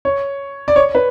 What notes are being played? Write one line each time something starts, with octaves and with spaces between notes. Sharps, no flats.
C#5
D5
C#5
B4